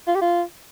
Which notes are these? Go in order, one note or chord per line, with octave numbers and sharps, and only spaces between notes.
F4
G4
F4